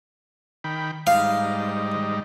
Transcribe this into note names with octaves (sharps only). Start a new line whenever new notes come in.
D#3 G5 B5
G#2 G3 D#4 F5